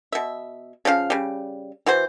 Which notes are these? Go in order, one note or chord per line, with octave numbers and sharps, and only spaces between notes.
B2 E5
C#3 F3 F#4 F5
C#3 G3
E3 F#4 C5